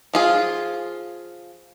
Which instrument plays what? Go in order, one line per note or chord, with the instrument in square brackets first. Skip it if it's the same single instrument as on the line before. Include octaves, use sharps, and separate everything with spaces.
[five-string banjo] F3 F4 G#4